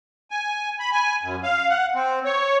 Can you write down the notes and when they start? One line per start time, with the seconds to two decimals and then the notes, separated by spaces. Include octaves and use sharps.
0.31 G#5
0.80 B5
0.92 G#5
1.23 F#2
1.43 F5
1.70 F#5
1.94 C4
2.25 C#5